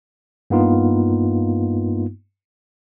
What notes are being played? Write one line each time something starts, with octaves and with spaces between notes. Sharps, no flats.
G2 A#3 B3 D#4 F4